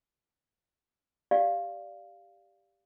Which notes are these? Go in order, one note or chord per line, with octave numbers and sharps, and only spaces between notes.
G4 D5 F5